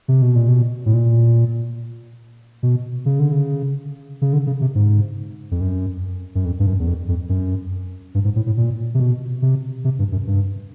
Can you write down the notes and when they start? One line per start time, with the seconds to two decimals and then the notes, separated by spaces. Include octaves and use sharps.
0.08 C3
0.22 B2
0.35 A#2
0.48 B2
0.86 A2
0.94 A#2
2.63 B2
3.06 C#3
3.19 D3
3.32 C#3
4.22 C#3
4.33 D3
4.47 C#3
4.61 C3
4.75 G#2
5.51 F2
5.61 F#2
6.35 F#2
6.45 F2
6.60 G2
6.67 F#2
6.79 E2
6.87 F2
7.08 F2
7.29 F#2
8.15 G2
8.25 G#2
8.36 A2
8.46 A2
8.57 A#2
8.94 C3
9.00 B2
9.42 C3
9.84 C3
9.99 G2
10.12 F#2
10.27 G2